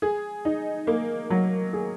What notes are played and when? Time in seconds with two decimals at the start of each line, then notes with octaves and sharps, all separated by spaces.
0.02 G#4
0.45 D#4
0.87 A#3
1.30 F#3
1.73 G#4